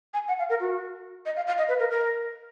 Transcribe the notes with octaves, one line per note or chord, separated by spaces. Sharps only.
G#5
F#5
F5
A#4
F#4
D#5
F5
F5
D#5
B4
A#4
A#4